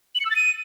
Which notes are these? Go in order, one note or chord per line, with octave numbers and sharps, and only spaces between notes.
F#7
C#7
E6
A6
D#7